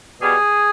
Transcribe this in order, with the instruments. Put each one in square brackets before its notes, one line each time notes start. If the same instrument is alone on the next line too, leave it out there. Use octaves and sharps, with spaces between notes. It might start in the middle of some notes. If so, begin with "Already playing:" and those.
[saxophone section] B2 G3 G#4